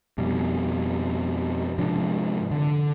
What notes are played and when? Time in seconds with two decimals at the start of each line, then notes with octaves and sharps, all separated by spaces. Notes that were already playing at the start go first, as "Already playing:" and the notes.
0.18 F2 B2 G3
1.78 G#2 C3 F3 D4
2.51 D3